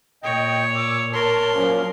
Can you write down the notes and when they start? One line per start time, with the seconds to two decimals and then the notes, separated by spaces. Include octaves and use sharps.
0.23 A#2 C#5 D#5 G5
0.75 D6 E6
1.13 A#4 C#5 A5 C6
1.54 F3 F#3 A#3 C#4